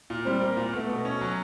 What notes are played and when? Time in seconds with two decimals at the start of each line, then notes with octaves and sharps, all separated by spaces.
0.10 A#2
0.26 G3 C4
0.41 A#3
0.57 A#2
0.73 A3 B3
0.89 B2
1.05 C#4
1.21 F#3